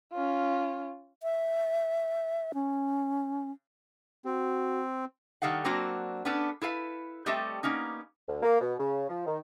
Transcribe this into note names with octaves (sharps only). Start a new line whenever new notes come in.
C#4 F4
E5
C#4
C4 F#4
D#3 G3 A4 F5 F#5
F#3 A#3 C4 D4 F#4
B3 C#4 D4 A4 B4
E4 A4 B4 F5
G3 A3 C4 G4 A4 D#5
A#3 B3 C#4 D#4
D2
A#3
B2
C#3
F3
D#3